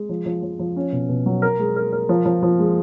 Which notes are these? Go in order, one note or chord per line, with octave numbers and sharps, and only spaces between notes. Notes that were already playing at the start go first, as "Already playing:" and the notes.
Already playing: G#3
F3
F3
F3
F3
C#4
B2
B2
F#3
A#4
G#3
A#4
A#4
F3
F3
F3
G#3